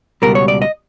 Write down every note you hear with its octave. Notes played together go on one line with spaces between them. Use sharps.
C#2 B2 G3 A#4
C#5
D5
D#5